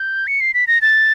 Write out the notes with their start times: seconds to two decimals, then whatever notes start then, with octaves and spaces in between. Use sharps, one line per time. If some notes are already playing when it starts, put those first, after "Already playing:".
Already playing: G6
0.27 C#7
0.41 C7
0.54 B6
0.67 A#6
0.82 A6